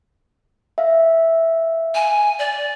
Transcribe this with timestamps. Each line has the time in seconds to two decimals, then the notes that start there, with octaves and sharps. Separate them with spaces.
0.78 E5 F5
1.95 G#5
2.39 D5